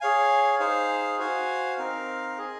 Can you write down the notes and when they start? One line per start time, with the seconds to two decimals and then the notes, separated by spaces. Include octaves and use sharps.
0.01 G#4 C#5 F5 G#5
0.60 D#4 G#4 C5 F5
1.19 F#4 C5 F5 G#5
1.78 C4 D#4 A#4 F5
2.38 G#4 D#5 G#5